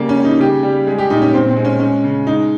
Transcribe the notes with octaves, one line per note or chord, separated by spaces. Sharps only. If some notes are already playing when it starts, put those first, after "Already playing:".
Already playing: C#3 G3 A#3
C#4
G3
D#4
C#3 G4
G3
G#3 G#4
G4
A#2 D#4
C#4
A#2 C4
C4
G#3
C#4
G#3 C#4
C#3
G#3 D#4